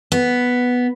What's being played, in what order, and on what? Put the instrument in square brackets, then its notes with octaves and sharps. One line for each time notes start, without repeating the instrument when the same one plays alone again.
[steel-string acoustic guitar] B3